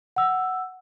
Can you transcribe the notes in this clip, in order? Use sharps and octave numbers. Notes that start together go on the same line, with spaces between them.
F#5 E6